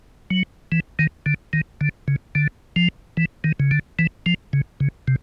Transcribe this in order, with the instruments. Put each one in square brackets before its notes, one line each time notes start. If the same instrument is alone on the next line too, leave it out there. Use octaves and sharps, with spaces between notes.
[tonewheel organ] F#3
E3
D#3
D3
D#3
D3
C#3
D3
F3
E3
D#3
C#3
D3
E3
F3
C#3
C#3
C3